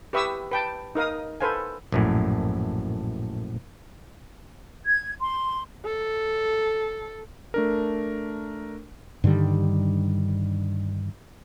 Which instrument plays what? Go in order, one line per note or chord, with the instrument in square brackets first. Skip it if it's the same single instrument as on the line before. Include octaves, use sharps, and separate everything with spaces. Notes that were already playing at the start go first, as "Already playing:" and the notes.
[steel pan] G4 B4 E5 C#6 D#6 E6
B4 G5 A5
D#4 A#4 F5 D#6
A4 B4 C5 F5 G#5
[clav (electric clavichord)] A#1 F#2 A2
[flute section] G#6
C6
[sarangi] A4
[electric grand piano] A3 D4 A#4
[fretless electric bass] G2 D3 D#3 G3